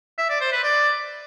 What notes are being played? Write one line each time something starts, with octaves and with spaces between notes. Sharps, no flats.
E5
D5
C5
B4
D5